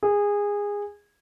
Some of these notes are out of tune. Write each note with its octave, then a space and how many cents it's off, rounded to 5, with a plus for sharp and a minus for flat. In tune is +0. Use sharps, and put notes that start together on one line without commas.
G#4 -20